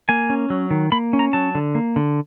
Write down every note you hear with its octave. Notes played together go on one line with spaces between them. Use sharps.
A#3 G#5
C#4
F#3
D#3
A#3 B5
C#4
A#5
F#3 A5
D3
A#3
D3